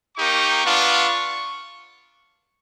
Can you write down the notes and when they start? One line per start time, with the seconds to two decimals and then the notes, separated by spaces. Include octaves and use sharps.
0.17 A#3 D#4 G4 C#6
0.63 B3 D4 F4